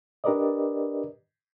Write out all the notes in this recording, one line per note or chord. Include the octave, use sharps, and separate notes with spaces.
D4 G4 A#4 B4 D5 D#5